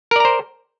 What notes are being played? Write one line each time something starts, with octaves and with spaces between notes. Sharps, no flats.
A#4 C5 D5 A#5